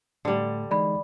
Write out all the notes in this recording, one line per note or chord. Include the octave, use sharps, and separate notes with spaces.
A2 D3 G3 A3
E3 G#3 D#4 D5 B5